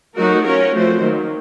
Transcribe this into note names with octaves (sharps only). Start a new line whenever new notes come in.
F#3 A3 D#4 F#4 A#4
C#4 F4 A#4 C#5
F3 A3 C4 F#4 C5
D#3 F#3 A#3